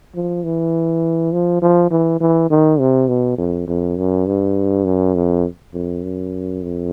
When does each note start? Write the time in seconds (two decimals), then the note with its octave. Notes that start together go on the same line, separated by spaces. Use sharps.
0.15 F3
0.43 E3
1.32 F3
1.62 F3
1.91 E3
2.20 E3
2.50 D#3
2.80 C3
3.08 B2
3.38 F2
3.68 F2
3.97 F#2
4.26 G2
4.85 F#2
5.15 F2
5.74 F2
6.03 F#2
6.62 F2